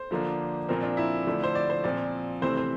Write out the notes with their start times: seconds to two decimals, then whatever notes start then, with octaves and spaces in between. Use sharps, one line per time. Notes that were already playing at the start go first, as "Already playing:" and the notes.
Already playing: C5
0.11 D3 F3 A#3 D4
0.69 A#2 F3 C4 A#4
0.83 D4
0.97 E4
1.27 D3 F3 A3 D4
1.44 C5
1.55 D5
1.70 C5
1.84 A#2 F3 C4 D5
2.42 C3 E3 A3 C4 C5
2.57 C5